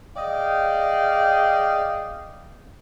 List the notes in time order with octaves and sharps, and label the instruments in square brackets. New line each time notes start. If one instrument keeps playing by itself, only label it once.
[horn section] G#4 D5 D#5 F5 G5